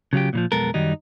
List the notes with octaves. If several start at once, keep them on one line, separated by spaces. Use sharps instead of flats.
C#3 F#3 F4 G4
A#2 E3 F3
B1 F2 G#3 B3 A4 A#4
F#2 D#3 F#3 G3 D#4